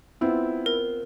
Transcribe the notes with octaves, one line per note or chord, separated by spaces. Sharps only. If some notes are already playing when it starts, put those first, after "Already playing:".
B3 C4 E4 F4
A#4